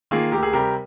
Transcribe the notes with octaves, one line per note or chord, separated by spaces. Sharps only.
D#3 A#3 F4 G#4
D2 G4 A#4
G#4
C3 G3 G4 A#4